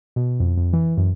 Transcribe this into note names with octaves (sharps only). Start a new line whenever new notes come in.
B2
F2
F2
E3
F#2